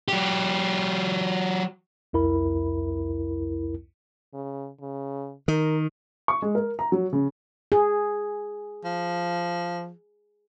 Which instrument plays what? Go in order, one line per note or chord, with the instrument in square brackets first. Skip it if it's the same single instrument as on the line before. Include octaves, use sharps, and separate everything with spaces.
[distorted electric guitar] F#3 G4
[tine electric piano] C2 F2 E4 A#4 B5
[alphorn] C#3
C#3
[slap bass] D#3 [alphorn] A#4
[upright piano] C#6
G#3
A#4
A#5
F#3
C#3
[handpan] G#4
[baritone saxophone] F3